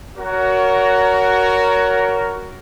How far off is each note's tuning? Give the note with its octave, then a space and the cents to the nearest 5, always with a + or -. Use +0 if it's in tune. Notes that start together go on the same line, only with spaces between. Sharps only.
F#4 +10 A#4 +0 C#5 +25